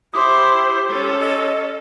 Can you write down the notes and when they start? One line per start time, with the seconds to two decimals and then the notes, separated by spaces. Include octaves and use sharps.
0.14 E4 G4 C5 C6 D6 D#6
0.89 C#4 A4
1.20 D#5